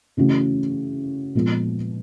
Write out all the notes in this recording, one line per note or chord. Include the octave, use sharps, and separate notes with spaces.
C#3 E3 A3 C#4 F#4
A#2 F3 G#3 B3